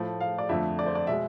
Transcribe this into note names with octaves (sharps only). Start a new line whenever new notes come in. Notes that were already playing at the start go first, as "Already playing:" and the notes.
Already playing: A2 F3 A3
F5
D5
F2 D3 F3 A3 E5
D5
C5
D5
B2 G#3 E5